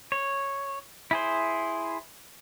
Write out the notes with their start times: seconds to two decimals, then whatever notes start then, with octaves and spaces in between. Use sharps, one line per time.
0.12 C#5
1.11 E4 G#4 C5